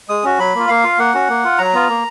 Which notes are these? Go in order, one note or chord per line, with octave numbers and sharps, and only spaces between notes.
G#3 D#6
C#4 F#4
F#3 B5
A#3 F4
A#3 F5
F4
A#3 F#5
C#4 F#4
A#3
F4
F#3 A#5
B3 F4
A#3